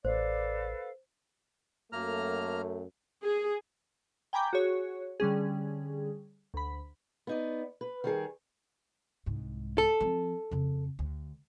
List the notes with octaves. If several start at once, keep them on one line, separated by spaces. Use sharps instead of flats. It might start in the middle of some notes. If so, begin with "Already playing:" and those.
A1 A4 B4 C5 D5 F5
F#2 A3 A#3 A#5 F6
G#4
G5 G#5 A#5 B5 D6 G6
F#4 G#4 C#5
D3 G3 C#4 G#4
D2 B5
B3 D#4 D5
B4
D#3 G3 G#4
C2 G#2
A4
F3 C4
F2 C#3
D2